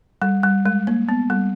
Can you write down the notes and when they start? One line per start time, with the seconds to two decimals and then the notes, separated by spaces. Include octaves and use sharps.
0.22 G3
0.43 G3
0.66 G#3
0.87 A#3
1.09 B3
1.30 G3